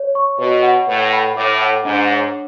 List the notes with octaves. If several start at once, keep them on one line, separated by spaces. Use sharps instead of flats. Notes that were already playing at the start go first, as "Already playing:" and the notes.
Already playing: C#5
C#6
B2 C#5
F#5
A2 B4
B5
A2 D6
F#5
G#2 D4
C#5